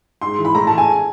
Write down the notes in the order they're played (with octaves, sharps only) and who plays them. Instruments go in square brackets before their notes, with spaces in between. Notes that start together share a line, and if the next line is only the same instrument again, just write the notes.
[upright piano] G#2 C6
E3
B5
A2 A#5
A5
E3
G#5